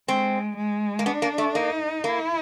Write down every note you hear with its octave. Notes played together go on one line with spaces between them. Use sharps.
G#3 C4
G#3
A#3
B3 D4
A#3
A3
A#3 D#4
A#3 E4